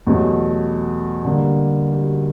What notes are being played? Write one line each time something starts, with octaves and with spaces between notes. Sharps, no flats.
E2 B2 F#3 A3 G4
D3 G3 A#3
G4
F#4